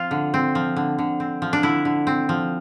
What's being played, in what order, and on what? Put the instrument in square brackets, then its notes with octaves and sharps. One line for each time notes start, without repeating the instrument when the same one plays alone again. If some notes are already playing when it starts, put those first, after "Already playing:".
Already playing: [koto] F3 C4 F4
D3
C4
F3
D3
D3
C4
F3
D4
D3 E4
D3
C4
F3